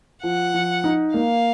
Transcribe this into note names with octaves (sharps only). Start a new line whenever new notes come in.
F3 F#5
F3
D#4
A#3 F5